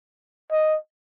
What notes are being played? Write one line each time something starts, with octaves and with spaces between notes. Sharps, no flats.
D#5